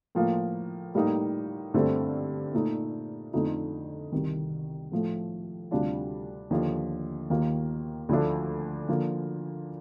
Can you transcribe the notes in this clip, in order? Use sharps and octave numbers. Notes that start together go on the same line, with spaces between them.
A2 F3 A#3 F4
A2 G3 A#3 D#4
G2 D3 A3 C4
A#2 A3 D#4
F2 D3 A3 D#4
C2 C3 D#3
A2 F3 A3
D2 C3 G3 D4 F4
D#2 D3 F3
D#2 D#3 A#3 F4
D2 D3 F3 A3 D4
D3 F3 A#3